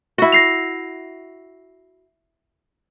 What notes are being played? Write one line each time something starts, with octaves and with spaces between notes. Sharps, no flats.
E4 F#4
A#6 C7 F7